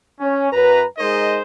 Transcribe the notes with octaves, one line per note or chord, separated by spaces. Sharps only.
C#4
F#2 B4 A#5
G#3 D#4 G#4 A#4 C5 D#5